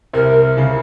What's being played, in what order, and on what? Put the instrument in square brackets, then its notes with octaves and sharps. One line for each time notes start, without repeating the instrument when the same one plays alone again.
[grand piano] C2 C3 [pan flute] A#4
[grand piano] C#3